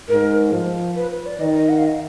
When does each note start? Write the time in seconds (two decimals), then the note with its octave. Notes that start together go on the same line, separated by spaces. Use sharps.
0.08 G#2 A#4
0.52 F3
0.96 B4
1.12 B4
1.26 D5
1.40 D#3 D#5
1.55 D#5
1.69 F#5
1.78 F5
1.86 D#5